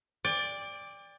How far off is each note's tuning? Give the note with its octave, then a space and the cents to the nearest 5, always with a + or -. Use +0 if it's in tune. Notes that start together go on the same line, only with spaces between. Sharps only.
D5 +0 G5 +35